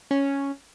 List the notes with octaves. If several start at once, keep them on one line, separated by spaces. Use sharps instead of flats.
C#4